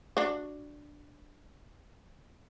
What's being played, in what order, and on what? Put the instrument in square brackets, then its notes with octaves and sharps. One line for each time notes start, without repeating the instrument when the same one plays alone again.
[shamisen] D4 F#4